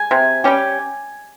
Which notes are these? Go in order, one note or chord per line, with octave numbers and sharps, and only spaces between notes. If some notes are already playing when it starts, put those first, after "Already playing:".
Already playing: G#5
C3
G3 C#4 G4